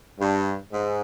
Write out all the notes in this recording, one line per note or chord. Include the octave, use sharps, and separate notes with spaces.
G2
G#2